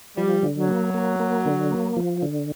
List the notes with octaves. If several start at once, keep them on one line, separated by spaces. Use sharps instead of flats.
F3 G3
D3
F#3
A#3
A#3
A#3
D3
A#3
F3
D3